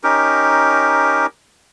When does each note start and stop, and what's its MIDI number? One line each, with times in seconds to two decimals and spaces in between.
0.04 1.26 61
0.04 1.26 63
0.04 1.26 67
0.04 1.26 70